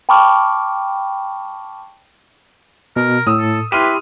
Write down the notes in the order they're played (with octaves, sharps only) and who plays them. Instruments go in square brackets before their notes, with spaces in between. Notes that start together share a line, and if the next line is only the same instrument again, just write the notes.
[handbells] G5 A5 B5 C#6 D6 F6
[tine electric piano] B2 [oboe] A#4
[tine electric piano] A2 [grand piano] D#6 E6
[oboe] A4
[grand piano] E4 F6 D#7 [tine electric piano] G4 B5 C6 [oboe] B4